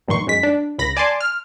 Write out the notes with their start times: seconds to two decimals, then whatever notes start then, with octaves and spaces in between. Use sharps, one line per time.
0.08 A#1 G2 D#3 C6 C#6
0.27 F#2 G#3 B6
0.43 D4
0.78 C#2 B5 A#6
0.97 D5 G#5 A5 C6 D6
1.21 F6